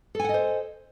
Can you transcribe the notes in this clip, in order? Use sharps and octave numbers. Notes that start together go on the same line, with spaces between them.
A4 C5 D#5 F#5 G#5